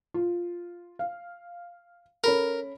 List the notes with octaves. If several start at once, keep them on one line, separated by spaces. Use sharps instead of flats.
F4
F5
C#4 A4 A#4 B5